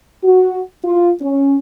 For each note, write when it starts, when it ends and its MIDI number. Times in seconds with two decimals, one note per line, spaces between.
0.23 0.59 66
0.84 1.10 65
1.21 1.55 61